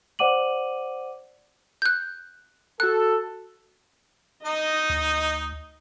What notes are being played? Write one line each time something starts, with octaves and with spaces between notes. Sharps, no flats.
C5 D5 F#5 D6 D#7 F#7
F#6 G6
F#4 A4 A5 F#6
D#4 D#5 D#6
D2